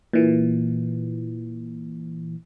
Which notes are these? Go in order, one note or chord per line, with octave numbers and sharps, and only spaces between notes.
A#2 E3